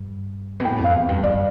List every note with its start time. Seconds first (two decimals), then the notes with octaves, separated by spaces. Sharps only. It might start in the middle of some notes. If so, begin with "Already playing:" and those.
Already playing: G2
0.60 B2
0.65 A2 G5
0.79 F2
0.84 F5
0.94 E2
1.09 G2
1.23 G2 D5